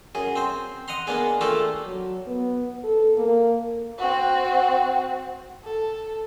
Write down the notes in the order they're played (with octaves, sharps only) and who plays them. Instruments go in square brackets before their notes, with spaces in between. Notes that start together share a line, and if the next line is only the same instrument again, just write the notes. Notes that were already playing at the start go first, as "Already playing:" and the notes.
[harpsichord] F#2 G#4
C4 C5
D#5 F#5 A#5 C6
G#3 A#3 B3 D4 G#4
A3 A#3 D4 F4 G4 A4
[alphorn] F#3
B3
A4
A#3
[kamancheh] C4 F#4
A4